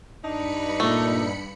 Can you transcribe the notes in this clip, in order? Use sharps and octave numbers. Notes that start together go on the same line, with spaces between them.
G2 D4 D#4 B5 C#7
A#2 A3